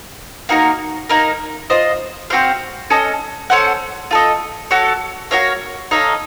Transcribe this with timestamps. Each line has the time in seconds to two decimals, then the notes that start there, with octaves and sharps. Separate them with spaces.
0.49 A#3 D#4 F#4 A#4
1.09 A#3 D#4 A#4
1.70 F4 C5 D#5
2.30 C4 F#4 C5 F5
2.90 C#4 A4 D#5
3.50 C#4 A4 C5 F#5
4.11 F4 A4 D#5
4.71 F#4 A4 C#5
5.31 F#4 A#4 C#5 F5
5.91 D#4 A4 C#5 F5